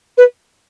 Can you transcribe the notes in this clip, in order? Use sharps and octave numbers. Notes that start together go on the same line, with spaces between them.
B4